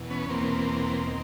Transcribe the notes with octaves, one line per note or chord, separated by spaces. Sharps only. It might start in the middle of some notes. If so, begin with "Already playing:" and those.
Already playing: E2 B2
B3 C#4
E2 B2 A#3 C4
D#3